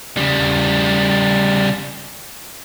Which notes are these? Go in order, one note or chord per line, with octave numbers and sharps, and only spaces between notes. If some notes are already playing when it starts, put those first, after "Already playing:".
C#3 G3